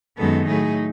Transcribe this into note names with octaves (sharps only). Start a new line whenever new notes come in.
F#2 D#3 G#3 B3 D#4 A4
A2 F#3 A3 D#4 G#4